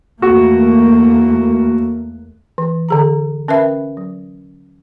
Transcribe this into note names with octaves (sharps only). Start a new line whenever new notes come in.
E2 A3 A#3 F#4
E3
D3 G#4 A#5
C#4 A#4 B4 E5 G5 B5
F#3